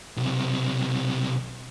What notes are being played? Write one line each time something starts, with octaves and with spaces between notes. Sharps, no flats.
B1 C3